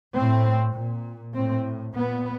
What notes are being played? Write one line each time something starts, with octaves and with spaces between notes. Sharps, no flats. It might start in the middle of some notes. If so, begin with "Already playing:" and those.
A2 C4
A#2
A2 C4
A#2 B3